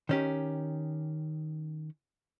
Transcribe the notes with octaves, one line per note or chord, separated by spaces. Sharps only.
D#3 C#4 G4